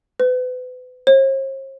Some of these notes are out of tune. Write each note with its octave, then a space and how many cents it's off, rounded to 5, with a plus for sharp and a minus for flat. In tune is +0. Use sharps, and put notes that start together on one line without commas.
B4 +35
C5 +45